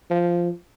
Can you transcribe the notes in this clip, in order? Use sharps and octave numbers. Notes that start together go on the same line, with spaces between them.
F3